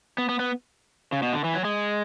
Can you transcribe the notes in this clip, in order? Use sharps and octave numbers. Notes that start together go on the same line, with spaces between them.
B3
B3
B3
C#3
B2
D3
E3
F#3
G#3